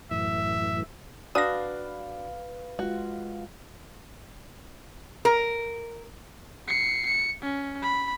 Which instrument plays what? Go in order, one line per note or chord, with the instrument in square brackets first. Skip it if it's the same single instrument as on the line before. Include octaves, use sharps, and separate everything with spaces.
[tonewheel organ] F#2 A2 E3 [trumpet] E5
[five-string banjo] D4 F#4 [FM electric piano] B4 F5 [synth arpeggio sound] D#6 A#6
[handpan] G#3 F4 [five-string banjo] F#4
[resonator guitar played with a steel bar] A#4
[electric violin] C7 C#7
C#7
C#4
B5